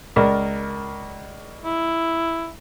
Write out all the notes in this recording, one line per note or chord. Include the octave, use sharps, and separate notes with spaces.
C#2 A#4 D5
E4